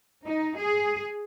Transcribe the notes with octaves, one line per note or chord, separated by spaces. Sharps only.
D#4
G#4